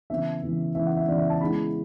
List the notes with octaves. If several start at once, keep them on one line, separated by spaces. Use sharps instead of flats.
C#3 E3 B3 E5
C#3 E3 B3
C#3 E3 B3 E5
F#5
E5
C#3 E3 B3 D5
E5
A5
C#3 G#3 B3 E4 B5